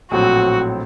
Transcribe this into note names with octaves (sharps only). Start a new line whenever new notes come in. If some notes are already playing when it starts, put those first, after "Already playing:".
A#1 A2 F#3 C4 F#4